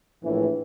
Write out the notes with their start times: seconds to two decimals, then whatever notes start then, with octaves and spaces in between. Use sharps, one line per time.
0.22 A#1 A2 E3